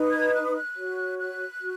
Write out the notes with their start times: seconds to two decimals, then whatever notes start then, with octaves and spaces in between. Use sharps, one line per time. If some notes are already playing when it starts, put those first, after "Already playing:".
Already playing: D#4 B4
0.11 G#6
0.33 F#6
0.44 D#6
0.56 F#6
0.75 F#4 C#5
1.18 F#6
1.61 F#4